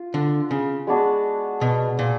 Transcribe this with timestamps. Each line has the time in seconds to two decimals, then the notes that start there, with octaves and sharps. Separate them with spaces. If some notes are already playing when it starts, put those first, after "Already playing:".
Already playing: F4
0.14 D3
0.51 C#3
0.87 G#3 B3 D4 F#4
1.61 B2
1.99 A#2